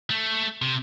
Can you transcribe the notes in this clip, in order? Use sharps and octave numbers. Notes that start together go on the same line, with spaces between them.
A3
C3